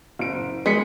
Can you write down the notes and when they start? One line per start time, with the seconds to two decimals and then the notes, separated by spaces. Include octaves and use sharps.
0.19 F#1 D7
0.66 G#3 B3 B6 C#7